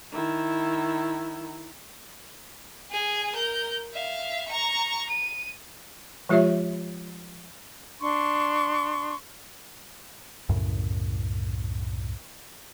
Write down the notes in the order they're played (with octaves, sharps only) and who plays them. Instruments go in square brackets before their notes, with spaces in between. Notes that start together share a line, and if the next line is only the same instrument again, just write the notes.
[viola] D#3 E4
[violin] G#4 G#5
A#4 G6
E5 F5
A#5 C#6
D#7
[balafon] F3 G#3 F4 G4 C#5 E5
[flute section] D4 C6 C#6
[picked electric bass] C2 F#2 A2 C#3